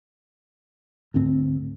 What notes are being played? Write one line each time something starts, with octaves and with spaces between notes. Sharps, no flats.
D2 G#2 C4